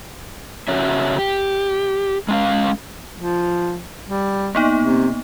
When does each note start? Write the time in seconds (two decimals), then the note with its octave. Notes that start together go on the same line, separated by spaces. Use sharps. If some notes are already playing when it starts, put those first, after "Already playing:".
0.68 C#3 C#4 F#4 C#5 E5
1.19 G4
2.29 G#3 C#4 F5
3.18 F3
4.07 G3
4.55 A#3 B3 D#4
4.81 C3